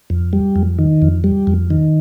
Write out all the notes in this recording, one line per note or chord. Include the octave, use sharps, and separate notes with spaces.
F2
G3
F2
D#3
F2
G3
F2
D#3